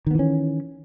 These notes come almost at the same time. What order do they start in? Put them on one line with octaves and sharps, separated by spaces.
D#3 B3 E3 C#4